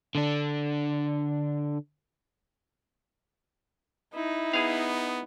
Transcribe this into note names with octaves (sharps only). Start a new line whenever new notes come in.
D3 D4
D#4 E4
B3 G#4 F5